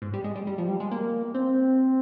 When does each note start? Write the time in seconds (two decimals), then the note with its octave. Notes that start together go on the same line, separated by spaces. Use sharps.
0.02 G#2
0.14 G3
0.24 G#3
0.36 G3
0.47 G3
0.58 F3
0.68 G3
0.80 G#3
0.91 A#3
1.35 C4